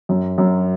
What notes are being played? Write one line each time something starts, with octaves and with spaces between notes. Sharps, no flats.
F#2
F#2